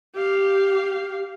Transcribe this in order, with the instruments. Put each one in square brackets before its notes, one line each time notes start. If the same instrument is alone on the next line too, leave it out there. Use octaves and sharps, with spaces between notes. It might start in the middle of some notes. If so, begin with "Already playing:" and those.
[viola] G4 F5